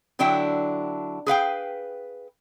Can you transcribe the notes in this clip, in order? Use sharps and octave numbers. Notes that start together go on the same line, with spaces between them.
D3 F#3 D4 E4 G5
G#4 B4 F5 G5